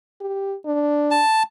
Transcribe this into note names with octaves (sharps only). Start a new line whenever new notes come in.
G4
D4
A5